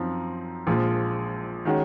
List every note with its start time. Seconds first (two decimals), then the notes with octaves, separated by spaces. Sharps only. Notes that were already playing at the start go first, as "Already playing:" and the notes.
Already playing: F#2 F3 C4 D#4
0.67 A#1 A#2 F3 G#3
1.65 D#3 G#3 C#4 F#4